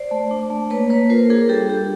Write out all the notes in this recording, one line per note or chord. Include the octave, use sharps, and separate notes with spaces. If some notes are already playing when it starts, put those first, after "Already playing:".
Already playing: C5 D5
A3
D4
A3
A#3 B4 C#5
A#3 B4 C#5
F4 A#4 C5
D4 G#4 A#4
G3 G4 A4
D4 G4